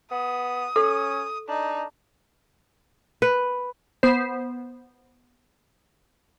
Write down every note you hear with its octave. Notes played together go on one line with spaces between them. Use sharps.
B3 D#6
C#4 A4
D4 D#4
B4
B3 C5